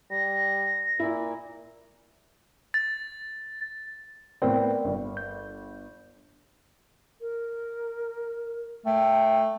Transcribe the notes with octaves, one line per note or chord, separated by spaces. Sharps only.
G3 A#6
A#2 E4
A6
A2 B3 C4 A#4 D5 G5
G1
G6
A#4
A3 G5